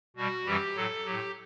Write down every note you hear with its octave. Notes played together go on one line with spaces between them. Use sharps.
B2 G3 F#4
F#2 E3 G3 G4
A2 F#3 A4
A2 F#3 G4